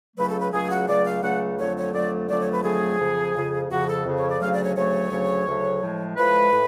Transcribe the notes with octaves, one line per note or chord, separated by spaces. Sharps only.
C#2 C#3 F#3 A3 B4
A4
B4
C#2 C#3 F#3 A3 G#4
F#4
C#2 C#3 F#3 A3 D5
F5
C#2 C#3 F#3 A3 F#5
F2 D3 F#3 A3 C#5
C#5
F2 D3 F#3 A3 D5
F2 D3 F#3 A3 D5
C#5
B4
F2 D3 F#3 A3 G#4
F2 C#3 F3
F2 C#3 F3
F2 C#3 F3 F#4
A4
F2 C#3 F3
C#5
D5
D2 C#3 F#3 A3 F5
D5
C#5
D2 C#3 F#3 A3 C#5
D2 C#3 F#3 A3
D2 C#3 F#3 A3
A2 F3 G#3
A2 F3 G#3 B4
A2